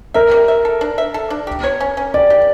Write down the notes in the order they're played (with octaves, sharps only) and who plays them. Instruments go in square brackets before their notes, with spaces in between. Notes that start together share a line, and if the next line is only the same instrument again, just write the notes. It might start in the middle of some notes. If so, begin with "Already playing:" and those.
[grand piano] A#4 [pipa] E5
[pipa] G3
E5
A4
D4
E5
A4
D4
G4
C#5
C#4
C#4
[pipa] G4 [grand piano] D5
[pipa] G4